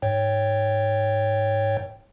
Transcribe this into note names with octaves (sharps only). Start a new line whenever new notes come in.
G#2 C#5 G5